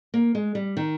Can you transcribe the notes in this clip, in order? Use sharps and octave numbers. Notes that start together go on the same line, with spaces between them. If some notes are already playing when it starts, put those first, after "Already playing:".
A#3
G#3
G3
D#3